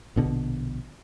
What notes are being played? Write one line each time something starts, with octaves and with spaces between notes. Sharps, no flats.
A#1 B2 D3